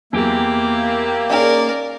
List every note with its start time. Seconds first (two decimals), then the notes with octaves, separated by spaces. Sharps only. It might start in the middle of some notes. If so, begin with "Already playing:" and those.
0.13 E2 F#3 A#3 C4 E4 G4 D7
1.30 C#4 D#4 G#4 A#4 D5